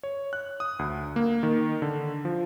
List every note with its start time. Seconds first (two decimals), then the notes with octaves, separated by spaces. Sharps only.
0.03 C#5
0.33 F#6
0.60 D#6
0.79 D2
1.16 A#3
1.43 D#3
1.82 D3
2.25 F3